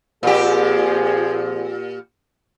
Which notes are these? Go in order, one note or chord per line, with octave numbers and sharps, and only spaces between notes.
A#2 F3 C4 G4 G#4